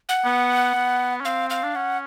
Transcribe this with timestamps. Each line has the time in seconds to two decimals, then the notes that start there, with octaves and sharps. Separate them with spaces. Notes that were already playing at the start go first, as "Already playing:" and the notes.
0.09 F#5
0.25 B3
0.75 B3
1.21 C#4
1.25 C4 F5
1.50 F5
1.63 D4
1.75 C#4 F#5